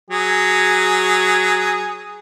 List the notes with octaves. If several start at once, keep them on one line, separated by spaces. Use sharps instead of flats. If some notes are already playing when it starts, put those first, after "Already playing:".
F#3 G#4